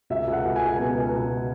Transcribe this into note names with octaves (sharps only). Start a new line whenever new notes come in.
C#2 E5
C#2
F#5
C#2
G#5
C#2
B2 G#5
C#2
C#2